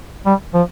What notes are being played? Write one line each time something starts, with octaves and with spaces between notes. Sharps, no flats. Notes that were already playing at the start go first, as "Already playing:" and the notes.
G3
F3